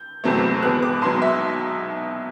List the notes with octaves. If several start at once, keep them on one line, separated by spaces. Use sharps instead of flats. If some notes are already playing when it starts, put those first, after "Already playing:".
Already playing: G6
F#1 E2 C3 F#3 A3
E1 E2 B2 F#6
D6
B1 B2 F#3 C6
E5